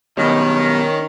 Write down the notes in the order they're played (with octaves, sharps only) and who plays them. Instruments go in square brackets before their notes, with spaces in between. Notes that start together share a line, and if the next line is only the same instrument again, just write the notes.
[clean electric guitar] F#2 B2 G3 [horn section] D#3 [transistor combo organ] C#4